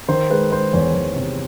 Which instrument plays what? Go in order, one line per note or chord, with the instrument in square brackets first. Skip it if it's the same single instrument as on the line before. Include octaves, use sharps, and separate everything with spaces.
[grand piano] D#3 C5
G#3 B4
G#3 C5
E2 B4 C#5
E2
C3